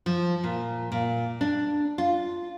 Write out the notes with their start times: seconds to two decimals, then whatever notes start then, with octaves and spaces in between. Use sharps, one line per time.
0.06 F3
0.44 A#2
0.92 A#2
1.41 D4
1.98 F4